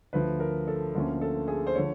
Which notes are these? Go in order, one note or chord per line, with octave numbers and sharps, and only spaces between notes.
D2 D3 F3 B4
A#4
A4
D2 D3 F3 A#3 C#4
A4
G#4
C5
D3 F3 C#5